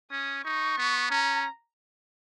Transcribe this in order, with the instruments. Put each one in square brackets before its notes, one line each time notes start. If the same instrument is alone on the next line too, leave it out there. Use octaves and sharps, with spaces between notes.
[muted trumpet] C#4 [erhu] D#6
[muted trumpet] D#4 [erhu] C#6
[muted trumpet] B3
[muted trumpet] C#4 [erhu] A#5